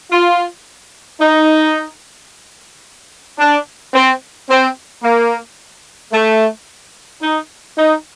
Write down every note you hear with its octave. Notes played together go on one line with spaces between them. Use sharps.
F4
D#4
D4
C4
C4
A#3
A3
D#4
D#4